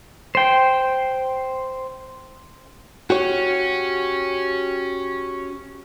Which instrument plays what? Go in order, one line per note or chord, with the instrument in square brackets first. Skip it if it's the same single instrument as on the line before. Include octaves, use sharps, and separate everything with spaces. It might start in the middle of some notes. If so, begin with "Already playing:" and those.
[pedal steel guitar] C5 G5
[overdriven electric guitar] C#4 [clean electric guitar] F#4 G4 C#5